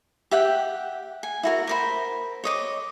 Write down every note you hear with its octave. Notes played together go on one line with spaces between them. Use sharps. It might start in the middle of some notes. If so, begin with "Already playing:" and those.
G4 E5 F#5 G5
G#5
E4 F#4 A#4
A#4 C5 B5
C#5 D#5 D6